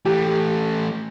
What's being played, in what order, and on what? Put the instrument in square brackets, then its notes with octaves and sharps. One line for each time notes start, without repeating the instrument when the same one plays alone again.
[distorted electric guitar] E3 A3 [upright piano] G4